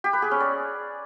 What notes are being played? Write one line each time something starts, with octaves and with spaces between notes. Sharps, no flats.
G4
B4
G#4
C#4
D5